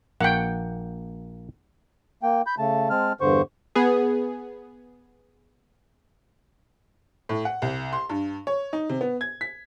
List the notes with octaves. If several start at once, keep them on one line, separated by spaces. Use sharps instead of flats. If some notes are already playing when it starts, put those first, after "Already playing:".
A#1 A#3 F#5 G5
A#3 G5
B5 G6
C#3 A3 A5
G#3 C4 A5 F6
E2 G2 D3 C5 C#6
B3 G#4
A2
F#5
C2
C6
G2
C#5
D#4
C3
B3
G#6
B6